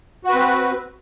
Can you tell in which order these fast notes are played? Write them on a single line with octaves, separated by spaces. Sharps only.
F#4 B4 C4